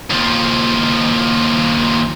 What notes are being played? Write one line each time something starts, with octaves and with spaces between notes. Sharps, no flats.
D#2 F3